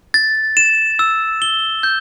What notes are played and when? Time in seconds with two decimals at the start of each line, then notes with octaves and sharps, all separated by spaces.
0.14 A6
0.57 E7
0.99 E6
1.42 G7
1.83 G6